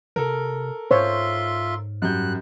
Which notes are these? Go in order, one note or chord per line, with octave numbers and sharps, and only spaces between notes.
C3 A4 A#4
G#2 F4 C5 C#5 E5 C6
F#2 G3 F#6 G6